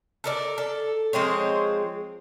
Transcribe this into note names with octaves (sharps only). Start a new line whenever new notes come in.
A4 A#4 D5
A4
F3 G#3 C4 C#5